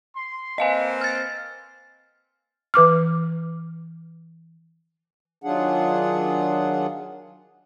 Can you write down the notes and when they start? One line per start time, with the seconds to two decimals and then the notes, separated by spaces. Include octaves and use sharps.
0.16 C6
0.58 A#3 C4 B4 D#5 F5 G#5
1.01 F6 A6
2.74 E3 B4 D6 F6
5.44 D#3 F#3 D4 F4 G#4 F#5